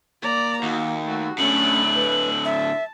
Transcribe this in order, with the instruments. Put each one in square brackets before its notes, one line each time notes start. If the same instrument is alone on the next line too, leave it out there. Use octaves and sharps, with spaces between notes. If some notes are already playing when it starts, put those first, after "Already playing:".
[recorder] A#3 [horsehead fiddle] D5 A#5
[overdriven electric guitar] D#2 [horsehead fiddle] F#4
[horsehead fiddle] A3 F#4
[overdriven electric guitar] A2 D3 [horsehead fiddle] A3 [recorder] C#4 [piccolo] F#7
[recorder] B4
[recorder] E5 [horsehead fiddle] A5